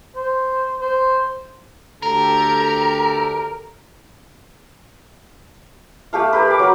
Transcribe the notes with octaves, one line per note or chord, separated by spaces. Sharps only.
C5
C5
D2 G4 A4 A#4
A3 G4 A4 F5
G4 A#4 B4
B5 D6
F#3 F#4 A#4